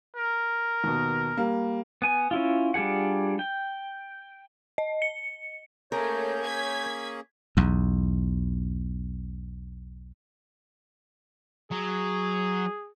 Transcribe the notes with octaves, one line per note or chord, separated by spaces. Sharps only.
A#4
D#2 B2
G3 A#3
B3 G#5
C#4 E4 F4
G3 D4 F4 G#4 F#5
G5
D#5
C#7
A3 A#3 C#4 G#4 A#4 C#5 G6
G#6 B6
B1 E2
F#3 G#4